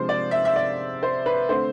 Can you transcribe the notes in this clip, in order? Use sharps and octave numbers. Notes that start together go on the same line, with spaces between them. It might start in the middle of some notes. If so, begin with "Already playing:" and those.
Already playing: C3 F3 G#3 D4 C5
D5
E5
E5
D5
C5
B4
D3 A3 C4 C5